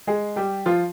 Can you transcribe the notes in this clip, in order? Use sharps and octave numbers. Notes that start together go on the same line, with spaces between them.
G#3 G#4
G3 G4
F3 F4